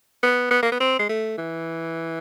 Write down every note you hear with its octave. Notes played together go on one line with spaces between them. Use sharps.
B3
B3
A#3
B3
C4
G#3
A3
E3